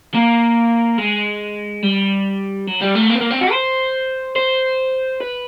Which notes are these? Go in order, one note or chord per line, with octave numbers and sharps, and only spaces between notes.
A#3
G#3
G3
F#3
G3
A3
A#3
B3
A#3
C4
F#4
C5
C5
B4